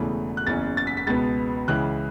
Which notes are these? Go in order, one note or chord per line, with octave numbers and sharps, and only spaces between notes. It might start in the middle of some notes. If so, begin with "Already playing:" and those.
Already playing: E1 E2 C#3 E3 A3
F#6
F#1 E2 E3 C#4 A6
A6
B6
B6
C#2 B2 B3 A6
C#2 C#3 E3 F#6